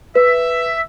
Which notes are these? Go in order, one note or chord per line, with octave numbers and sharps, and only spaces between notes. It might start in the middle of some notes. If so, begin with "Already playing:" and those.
B4 E5